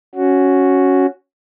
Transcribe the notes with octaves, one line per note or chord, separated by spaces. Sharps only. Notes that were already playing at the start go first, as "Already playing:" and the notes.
C#4 F#4